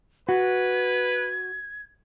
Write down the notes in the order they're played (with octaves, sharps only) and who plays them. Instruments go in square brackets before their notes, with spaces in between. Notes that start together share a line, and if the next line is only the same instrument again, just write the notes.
[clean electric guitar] F#4 [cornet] B4 [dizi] G#6